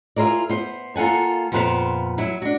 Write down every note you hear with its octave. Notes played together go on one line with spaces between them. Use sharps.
E4 F4 G#4 A#4 D5
B3 C5
A#3 F4 A4 F#5 G#5
F2 A#2 B3 B4 C5 F5
F#3 E4
D4 F#4